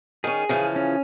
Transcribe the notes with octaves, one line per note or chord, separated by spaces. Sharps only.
D#3 C#4 G#4
C#3 E3 F3
C#4